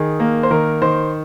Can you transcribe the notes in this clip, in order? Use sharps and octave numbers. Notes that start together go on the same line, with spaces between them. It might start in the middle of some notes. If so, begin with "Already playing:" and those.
Already playing: D#3 G#4
A#3
C5
D#3 A#4
D#3 C5